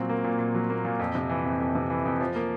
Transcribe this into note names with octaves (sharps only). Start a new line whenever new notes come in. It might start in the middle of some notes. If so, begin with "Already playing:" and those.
Already playing: A#2 F#3 C4
A#3
A#2
A#2
F#3
A#3
A#2
F2
C3
E3
F2
F2
C3
E3
F2
F3
A#3